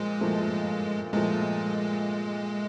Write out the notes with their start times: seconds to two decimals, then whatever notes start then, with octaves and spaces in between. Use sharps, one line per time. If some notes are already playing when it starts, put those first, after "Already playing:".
Already playing: A#2 F3 G#3
0.21 A#2 F3 A3
1.13 A#2 F3 G#3 A3